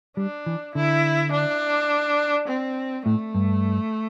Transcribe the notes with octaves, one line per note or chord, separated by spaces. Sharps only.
G3 D4
E3
D3 E4
D4
C4
A2 A3
G2